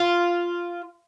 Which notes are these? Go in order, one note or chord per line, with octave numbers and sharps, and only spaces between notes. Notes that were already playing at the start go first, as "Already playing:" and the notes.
Already playing: F4